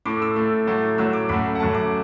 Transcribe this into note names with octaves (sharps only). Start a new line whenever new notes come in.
A2 A3 D6
E6
A3
A2
A2 F#3 A3
A2 F#3 A3 E6
D6
F#2 F#3 A3 B5
F#5
F#2 F#3 A3 A5
D6